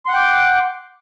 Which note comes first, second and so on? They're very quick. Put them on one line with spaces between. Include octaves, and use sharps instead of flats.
C6 F#5 F#6 G5 D6